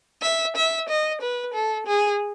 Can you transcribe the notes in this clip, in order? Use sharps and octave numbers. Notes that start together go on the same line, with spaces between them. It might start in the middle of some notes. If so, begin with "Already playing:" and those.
E5
E5
D#5
B4
A4
G#4